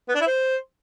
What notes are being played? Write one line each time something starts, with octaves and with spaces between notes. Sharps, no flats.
B3
D4
E4
C5